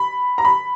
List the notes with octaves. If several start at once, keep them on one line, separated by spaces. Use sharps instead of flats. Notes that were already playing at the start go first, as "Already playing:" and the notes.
Already playing: B5
A#5
B5